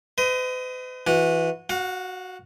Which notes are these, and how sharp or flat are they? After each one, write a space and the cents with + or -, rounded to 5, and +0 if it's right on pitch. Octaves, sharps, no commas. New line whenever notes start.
B4 +45 D#5 +15
E3 +0 F#4 -20
F#4 +0 F5 +40